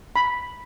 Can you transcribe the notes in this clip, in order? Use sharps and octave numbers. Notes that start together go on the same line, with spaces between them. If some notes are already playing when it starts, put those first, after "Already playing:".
B5